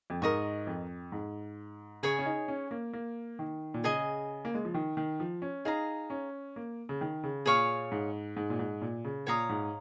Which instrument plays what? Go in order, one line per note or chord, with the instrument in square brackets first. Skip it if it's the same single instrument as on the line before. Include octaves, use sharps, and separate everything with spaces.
[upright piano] F2
[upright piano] G#2 [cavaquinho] A#4 D#5 C#6
[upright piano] F2
G#2
[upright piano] C#3 [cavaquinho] G#4 C#5 G#5
[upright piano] C#4
D#4
C#4
A#3
A#3
D#3
A#2
[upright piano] C#3 [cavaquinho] G#4 D#5 G#5
[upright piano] A#3
G#3
F3
D#3
D#3
F3
C#4
[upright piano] D#4 [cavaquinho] G#4 F5 A#5
[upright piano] C#4
A#3
C#3
D#3
C#3
[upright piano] A#2 [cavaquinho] G#4 C#5 F5 C#6
[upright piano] G#2
G#2
A#2
G#2
A#2
C#3
[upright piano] A#2 [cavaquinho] C#5 F5 A#5 D#6
[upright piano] G#2